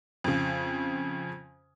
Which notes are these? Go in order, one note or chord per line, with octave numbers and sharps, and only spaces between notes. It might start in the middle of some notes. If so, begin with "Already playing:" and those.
F2 C#3